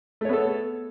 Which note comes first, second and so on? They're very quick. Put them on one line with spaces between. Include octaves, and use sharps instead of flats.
A3 C#5 B3 A4